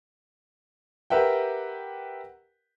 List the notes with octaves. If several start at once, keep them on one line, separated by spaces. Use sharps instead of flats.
G4 A#4 B4 E5 F#5 G5